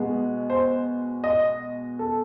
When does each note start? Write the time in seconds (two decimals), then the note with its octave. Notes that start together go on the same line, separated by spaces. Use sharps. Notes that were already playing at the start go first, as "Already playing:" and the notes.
Already playing: B2 G#3 B3
0.50 C5
1.24 D#5
1.99 A4